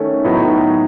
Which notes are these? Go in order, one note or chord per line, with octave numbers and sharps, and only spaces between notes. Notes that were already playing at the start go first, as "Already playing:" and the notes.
Already playing: D#3 A3 C#4
A2 F#3 B3 D#4